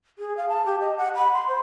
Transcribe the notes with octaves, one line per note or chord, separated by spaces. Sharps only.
G#4
F5
A5
G4
D#5
F#5
B5
C6
C5